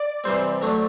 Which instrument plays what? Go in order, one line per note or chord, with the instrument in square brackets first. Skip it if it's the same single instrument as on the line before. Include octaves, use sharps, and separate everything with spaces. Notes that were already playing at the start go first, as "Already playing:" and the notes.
Already playing: [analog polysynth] D5
[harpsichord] C3 E3 G3 C4 [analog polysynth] C5
[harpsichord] F#3 A3 D4